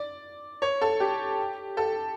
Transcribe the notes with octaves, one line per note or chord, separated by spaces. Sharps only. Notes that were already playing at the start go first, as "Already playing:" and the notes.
Already playing: D5
C#5
A4
G4
A4